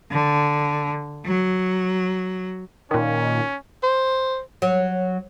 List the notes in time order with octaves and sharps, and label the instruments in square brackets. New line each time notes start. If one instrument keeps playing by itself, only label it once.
[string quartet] D3
F#3
[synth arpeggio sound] A#2 D#3 [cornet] C#4
[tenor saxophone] C5
[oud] F#3